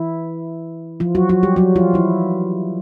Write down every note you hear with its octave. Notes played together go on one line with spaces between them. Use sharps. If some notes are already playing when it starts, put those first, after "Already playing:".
Already playing: E3 E4
F3 F4
F#3 F#4
F#3 F#4
G3 G4
F#3 F#4
F3 F4
E3 E4